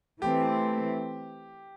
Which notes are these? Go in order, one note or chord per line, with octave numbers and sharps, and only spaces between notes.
E3 A3 C4 G4